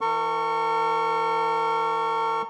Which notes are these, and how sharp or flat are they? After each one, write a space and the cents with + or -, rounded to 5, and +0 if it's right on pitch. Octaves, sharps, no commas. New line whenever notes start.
E3 +0 A#4 -45 C#6 +0